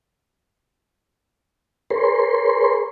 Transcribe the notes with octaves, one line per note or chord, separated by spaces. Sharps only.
G#4 A#4 B4 C#5 C6